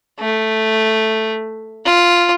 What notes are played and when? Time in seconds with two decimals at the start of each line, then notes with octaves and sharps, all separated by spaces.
0.20 A3
1.85 F4